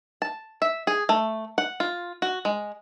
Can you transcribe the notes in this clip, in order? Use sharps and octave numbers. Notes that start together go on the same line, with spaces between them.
A5
E5
G#4
A3
F#5
F4
F#4
G#3